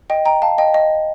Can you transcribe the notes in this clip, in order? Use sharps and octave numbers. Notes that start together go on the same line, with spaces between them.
D#5 G5
G5 A#5
F5 A5
D#5 G5
D#5